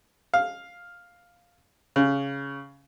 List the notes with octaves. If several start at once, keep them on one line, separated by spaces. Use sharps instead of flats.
F5
C#3